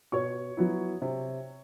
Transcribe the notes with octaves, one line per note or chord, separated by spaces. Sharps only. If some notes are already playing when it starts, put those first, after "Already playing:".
B2 C#5 C#6
F#3 B3 E4
C3